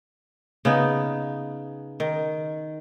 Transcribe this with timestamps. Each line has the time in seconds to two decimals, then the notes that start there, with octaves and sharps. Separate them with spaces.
0.65 C#3 B3 D#4
2.00 D#3